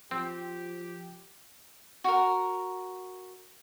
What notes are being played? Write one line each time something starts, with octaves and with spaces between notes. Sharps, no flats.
F3 C4 G4
F#4 A#4